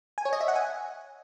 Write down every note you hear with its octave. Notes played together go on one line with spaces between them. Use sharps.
G#5
C#5
D#5
E5
F#5
G#5